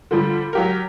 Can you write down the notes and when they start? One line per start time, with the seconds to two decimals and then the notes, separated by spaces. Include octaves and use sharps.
0.11 D3 F3 G3
0.53 F#3 G4 A#4